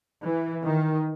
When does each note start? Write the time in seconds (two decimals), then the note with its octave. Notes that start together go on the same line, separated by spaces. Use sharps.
0.26 E3
0.66 D#3